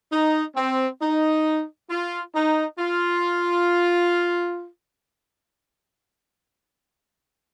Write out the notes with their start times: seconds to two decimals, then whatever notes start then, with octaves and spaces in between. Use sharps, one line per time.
0.11 D#4
0.56 C4
1.01 D#4
1.90 F4
2.35 D#4
2.79 F4